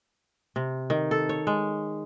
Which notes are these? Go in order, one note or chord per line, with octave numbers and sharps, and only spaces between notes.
C3
D#3
A4
C#5
G#3